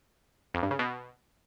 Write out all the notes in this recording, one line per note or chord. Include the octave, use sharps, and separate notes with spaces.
F2
G2
C#3
B2